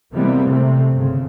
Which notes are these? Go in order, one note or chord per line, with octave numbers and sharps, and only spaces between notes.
C3 E3 G3 G#3 A#3 B3
C3 A3 C4
G1 C#3